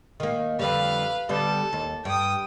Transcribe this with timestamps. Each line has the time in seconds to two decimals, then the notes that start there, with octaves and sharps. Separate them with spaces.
0.20 D#3 A#3
0.59 F2 D3 G3 B4 F5
1.29 D3 G3 B3 A4
1.73 D#2
2.05 G2 G5 D#6